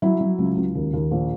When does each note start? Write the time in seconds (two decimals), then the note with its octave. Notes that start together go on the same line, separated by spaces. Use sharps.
0.02 F#3 E4
0.20 F#3
0.38 C#2
0.57 C#2
0.75 D#2
0.93 D#2
1.11 A#1